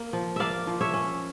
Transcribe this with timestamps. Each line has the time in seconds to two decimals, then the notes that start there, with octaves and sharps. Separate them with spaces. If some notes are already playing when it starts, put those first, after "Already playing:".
Already playing: A#3
0.13 F3
0.36 A#3 D5 E5 F5
0.67 F3
0.81 C#5 E5
0.94 C#4